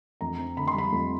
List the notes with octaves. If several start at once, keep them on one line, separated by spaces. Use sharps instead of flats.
F2 A#5
C4
D3 B5
C6
G3 B5
F2